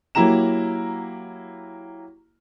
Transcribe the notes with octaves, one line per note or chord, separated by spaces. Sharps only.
F#3 A#3 E4 G4 A#5 E7